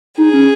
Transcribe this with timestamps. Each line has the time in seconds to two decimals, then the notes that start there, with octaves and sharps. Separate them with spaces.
0.17 D#4 G#4
0.33 C#4